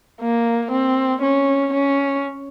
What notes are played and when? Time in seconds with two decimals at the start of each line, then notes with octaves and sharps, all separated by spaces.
0.21 A#3
0.72 C4
1.22 C#4
1.74 C#4